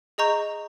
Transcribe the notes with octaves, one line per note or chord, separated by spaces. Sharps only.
G#4 D#5 A#5 C#6 G6